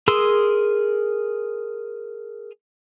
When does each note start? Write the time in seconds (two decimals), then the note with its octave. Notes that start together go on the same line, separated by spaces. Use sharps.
0.08 G#4 A#4 C6 D#6 E6